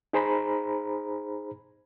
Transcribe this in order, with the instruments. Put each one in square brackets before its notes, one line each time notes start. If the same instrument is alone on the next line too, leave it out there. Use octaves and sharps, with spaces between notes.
[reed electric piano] D#4 G#4 C5 A#5 B5